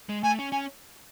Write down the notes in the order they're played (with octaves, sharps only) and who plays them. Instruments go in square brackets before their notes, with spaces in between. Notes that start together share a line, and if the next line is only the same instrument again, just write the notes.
[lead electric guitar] G#3
[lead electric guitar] A3 [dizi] G#5
[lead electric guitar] C#4
[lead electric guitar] C#4 [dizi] G#5